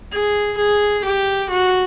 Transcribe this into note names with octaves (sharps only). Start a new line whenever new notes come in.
G#4
G#4
G4
F#4